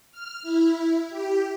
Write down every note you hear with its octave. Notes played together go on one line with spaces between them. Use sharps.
F6
E4
G4